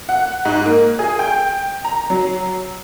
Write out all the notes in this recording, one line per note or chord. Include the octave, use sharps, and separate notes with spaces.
F#5
G#2
A#3
G#4
G5
A#5
F#3